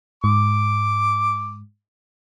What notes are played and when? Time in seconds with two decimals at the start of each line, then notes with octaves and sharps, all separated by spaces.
0.24 G#2 D6